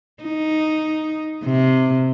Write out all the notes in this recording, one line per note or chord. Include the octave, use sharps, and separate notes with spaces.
D#4
C3